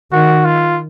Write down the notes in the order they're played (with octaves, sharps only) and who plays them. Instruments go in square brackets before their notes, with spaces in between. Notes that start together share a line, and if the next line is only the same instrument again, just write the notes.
[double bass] D#3 [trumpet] F#4
[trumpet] F4